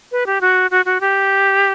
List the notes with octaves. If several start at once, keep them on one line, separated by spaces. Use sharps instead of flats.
B4
G4
F#4
F#4
F#4
G4